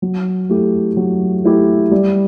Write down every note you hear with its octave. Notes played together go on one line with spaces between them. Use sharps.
F#3
A3 E4 G4
F#3
A3 E4 G4
G3